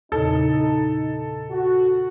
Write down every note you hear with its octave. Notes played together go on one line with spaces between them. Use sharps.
E2 A#2 C#3 D#4 A4
F#4